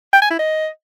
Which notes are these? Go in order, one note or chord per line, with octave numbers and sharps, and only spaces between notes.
G5
G#5
E4
D#5